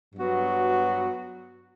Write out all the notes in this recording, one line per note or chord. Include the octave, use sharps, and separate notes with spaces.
G2 F#3 B3 F#4